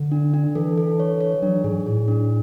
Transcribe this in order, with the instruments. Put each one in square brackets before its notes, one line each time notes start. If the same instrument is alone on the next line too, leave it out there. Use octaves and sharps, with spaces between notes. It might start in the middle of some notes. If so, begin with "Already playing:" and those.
Already playing: [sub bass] D3
[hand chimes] D4
D4
[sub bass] E3 [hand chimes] A4
[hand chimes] A4
C#5
C#5
[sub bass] F#3 [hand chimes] D4
[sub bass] G#2 [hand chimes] G#4
[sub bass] A2 [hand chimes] G#4
[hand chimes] D4